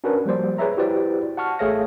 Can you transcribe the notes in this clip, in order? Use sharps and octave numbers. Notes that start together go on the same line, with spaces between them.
C#4 D4 F#4 A#4 B4
F3 G3 A#3 C5 D5
G#4 B4 C#5 D5 E5 A#5
E4 F#4 G4 B4 C5 D5
F#5 A5 C#6 F6
A1 A3 G#4 C#5 F5 A#6